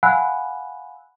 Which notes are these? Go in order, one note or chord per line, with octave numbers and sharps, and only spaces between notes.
F5 F#5 G#5 B5 E6 F#6